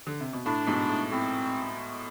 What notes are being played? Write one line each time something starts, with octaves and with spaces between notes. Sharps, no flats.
D3
C3
B2
A2 D4
G#2 B2
A2
A2 C4